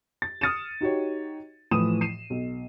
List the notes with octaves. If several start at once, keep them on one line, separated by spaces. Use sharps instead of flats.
A6
D#6 F6 A6 C#7 D#7 E7
D#4 F#4 G4 C#5
A2 E3 F3 D#6 D#7 E7
C7 D#7 E7
B1